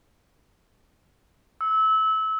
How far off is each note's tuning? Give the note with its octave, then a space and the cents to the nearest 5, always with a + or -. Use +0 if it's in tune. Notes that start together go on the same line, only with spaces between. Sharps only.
E6 -25